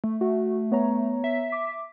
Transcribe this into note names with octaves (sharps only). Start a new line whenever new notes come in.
A3
A3 F#4
B3 C#5 A#5
E5
D6